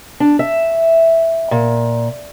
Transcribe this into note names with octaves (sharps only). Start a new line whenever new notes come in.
D4
E5
A#2